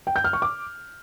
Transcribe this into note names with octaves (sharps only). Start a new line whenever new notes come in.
G5
G6
F6
C#6
D6